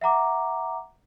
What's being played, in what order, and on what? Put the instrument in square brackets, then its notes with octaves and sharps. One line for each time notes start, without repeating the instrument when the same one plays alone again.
[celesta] E5 F#5 A#5 D6